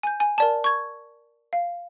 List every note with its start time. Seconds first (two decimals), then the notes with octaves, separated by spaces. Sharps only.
0.03 G#5 G6
0.20 G#5
0.38 A#4 D5 A5
0.64 C#6 G#6
1.53 F5